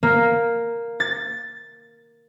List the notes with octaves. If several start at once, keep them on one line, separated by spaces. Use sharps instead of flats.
A#3
A6